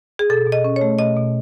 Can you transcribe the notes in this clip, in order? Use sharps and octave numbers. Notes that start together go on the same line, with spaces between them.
G#4
B2 A4
B2
D#5
C#4
C#5
A3
B2 D#5
B2